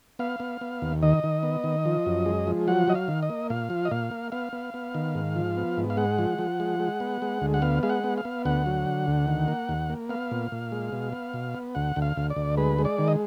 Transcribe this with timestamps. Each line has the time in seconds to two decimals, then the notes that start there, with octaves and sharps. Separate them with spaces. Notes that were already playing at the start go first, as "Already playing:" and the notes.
0.19 B3 F5
0.40 B3
0.61 B3
0.82 D#2
1.03 D#3 D#5
1.24 D#3
1.43 B3
1.64 D#3
1.85 F3
2.06 F#2
2.26 G#3
2.47 F3
2.68 F#3 F#5
2.88 F#3 D#5
2.95 F5
3.08 D#3
3.23 D#5
3.30 A#3
3.50 A#2 F5
3.70 F3
3.85 D#5
3.91 A#2 F5
4.11 A#3
4.32 B3 F5
4.53 B3
4.74 B3
4.95 D#3
5.15 G#2
5.36 F3
5.57 B3
5.77 G#2
5.90 F5
5.97 G#3 F#5
6.19 F3
6.39 F3
6.60 G#3
6.79 G#3
7.00 B3
7.22 G#3
7.42 D2
7.54 F#5
7.62 B3 F5
7.83 G#3 F5
7.90 F#5
8.04 B3
8.18 F5
8.25 B3
8.45 D2 F#5
8.66 F#3
8.86 D3
9.07 D2
9.28 D#3
9.48 A#3
9.69 D#2
9.90 A#3
10.09 B3 F5
10.31 A#2
10.52 A#2
10.72 G#3
10.92 B2
11.13 B3
11.34 B2
11.55 B3
11.75 D2 F#5
11.96 D2
12.02 F5
12.17 D2
12.30 D5
12.36 D2
12.57 G#3 B4
12.79 G#3
12.85 D5
12.98 D#3
13.08 D#5